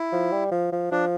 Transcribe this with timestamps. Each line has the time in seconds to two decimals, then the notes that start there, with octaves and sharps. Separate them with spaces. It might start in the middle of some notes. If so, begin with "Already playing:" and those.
Already playing: E4
0.12 F3
0.32 G3
0.51 F3
0.72 F3
0.91 F3 D4